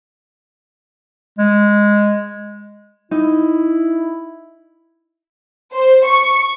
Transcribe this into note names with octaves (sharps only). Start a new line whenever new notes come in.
G#3
D#4 E4
C5
C#6